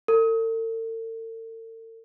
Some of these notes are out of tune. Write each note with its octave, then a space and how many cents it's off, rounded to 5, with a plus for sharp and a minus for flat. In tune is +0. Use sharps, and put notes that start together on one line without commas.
A4 +45